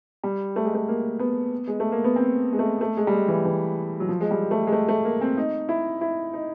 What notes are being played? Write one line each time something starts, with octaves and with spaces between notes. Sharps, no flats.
G3
A3
G#3
A3
A#3
B3
G#3
A3
A#3
B3
C4
G#3
A3
A3
G#3
G3
G#3
E3
E3
F#3
F3
G#3
G3
A3
G#3
A3
A3
A#3
C4
D#4
E4
E4
D#4